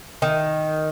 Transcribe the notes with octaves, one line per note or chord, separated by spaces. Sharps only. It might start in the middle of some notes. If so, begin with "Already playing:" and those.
D#3